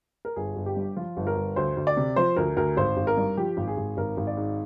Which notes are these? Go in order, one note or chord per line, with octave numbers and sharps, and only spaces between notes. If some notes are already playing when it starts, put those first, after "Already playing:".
A#4
G1 G#4
G1
G4
G2
F3 F4
G1
A#4
G1
D2 C5
D2
D5
C3
F3 C5
D2 A#4
D2 A#4
G#1 C5
G#1
A#4
G2
F3 G4
G#1
G#4
G#1
G#1 A#4
G#1
D5
G#2